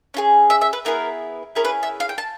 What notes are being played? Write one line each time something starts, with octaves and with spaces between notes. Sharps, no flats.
C#4 F4 G#4
E5
E5
B4
B3 E4 G#4 A#4
C#4 E4 G#4 A#4
B4
E5
F5
G5
A5